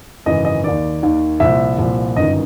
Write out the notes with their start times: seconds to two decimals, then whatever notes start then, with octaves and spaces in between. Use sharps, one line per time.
0.26 G#1 F#2 C#3 E3 D#5
0.45 D#5
0.64 D#2 D#3 D5
1.03 D#2 D#3
1.40 C2 A#2 F3 E5
1.78 C2 A#2 F3
2.16 G1 F#2 D#3 D#5